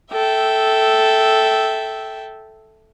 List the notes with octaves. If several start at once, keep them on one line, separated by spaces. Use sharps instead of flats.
A4 E5 G5